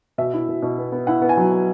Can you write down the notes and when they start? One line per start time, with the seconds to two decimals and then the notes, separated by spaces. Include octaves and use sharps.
0.18 B2 E5
0.34 E4
0.49 B2
0.62 B2
0.78 B3
0.92 B3
1.07 E4 F#5
1.22 B3
1.29 G#5
1.37 F#3
1.52 B3